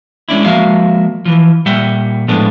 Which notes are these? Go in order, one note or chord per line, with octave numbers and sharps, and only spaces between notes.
G#3 C#4 D4 E4
F3 G#3 A#3 F#4 E5 F5
E3 F3
A#2 G3 E5 F#5 G5
A2 F3 G#3 A3 B3 D4